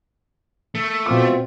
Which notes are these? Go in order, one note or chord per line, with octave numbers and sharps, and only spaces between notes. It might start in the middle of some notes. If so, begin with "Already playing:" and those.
A3
B2 C4 F4 D6